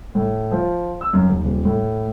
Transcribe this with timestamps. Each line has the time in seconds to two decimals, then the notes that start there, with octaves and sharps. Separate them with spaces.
0.15 A2
0.51 F3
1.01 E6
1.13 F#2
1.28 D#2
1.45 D#1
1.65 A2